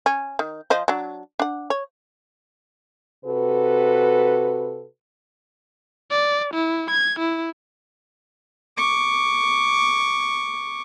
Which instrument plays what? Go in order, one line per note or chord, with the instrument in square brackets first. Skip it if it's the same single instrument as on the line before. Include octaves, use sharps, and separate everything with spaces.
[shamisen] C#4
D#3
F3 C5 D#5
F#3 D4
D4 F#5
C#5
[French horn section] C3 F#4 A4 B4
[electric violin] D5
E4
G#6
E4
[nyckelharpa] C#6 D6